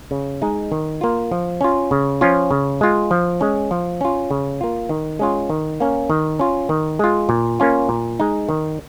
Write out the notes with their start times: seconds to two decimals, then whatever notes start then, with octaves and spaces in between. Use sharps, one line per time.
0.11 C#3
0.42 G#3 D#4
0.72 D#3
1.01 A#3 F4
1.32 F3
1.61 C#4 F4
1.91 C#3
2.21 F3 C#4 F4
2.51 C#3
2.81 G#3 F4
3.11 F3
3.41 G#3 C#4
3.71 F3
4.01 C#4 F4
4.31 C#3
4.61 A#3 F4
4.89 D#3
5.19 G#3 C#4 F4
5.50 D#3
5.80 A#3 C#4
6.10 D#3
6.39 C#4 F4
6.69 D#3
6.99 G#3 F4
7.29 A#2
7.60 A#3 C#4 F4
7.89 A#2
8.20 G#3 D#4
8.49 D#3